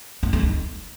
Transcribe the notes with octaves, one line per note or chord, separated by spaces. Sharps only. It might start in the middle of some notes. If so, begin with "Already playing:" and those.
E4
A3
D#4